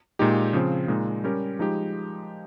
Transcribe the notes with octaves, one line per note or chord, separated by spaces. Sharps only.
A#2 G#3 D#4 G4
C#3 F3 C4
A#2 G#3 D#4
G3 C#4 G4 A#4
F3 G#3 D#4 G4